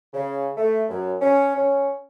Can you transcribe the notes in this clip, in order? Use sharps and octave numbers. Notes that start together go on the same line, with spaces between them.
C#3
A3
F#2
C#4
C#4